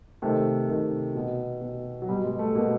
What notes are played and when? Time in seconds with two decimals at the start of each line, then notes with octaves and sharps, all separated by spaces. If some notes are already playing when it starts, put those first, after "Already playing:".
0.22 C3 D#3 A3
0.69 C3 D#3
1.15 B2
1.62 B2
2.02 F#3
2.09 B2 G3
2.24 G#3
2.39 A3
2.55 B2 A#3